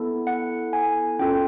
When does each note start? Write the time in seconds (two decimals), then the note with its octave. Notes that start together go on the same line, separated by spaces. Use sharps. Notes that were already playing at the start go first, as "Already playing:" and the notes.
Already playing: B3 E4 A4
0.27 F#5
0.73 G#5
1.19 C#4 F4 A4 G5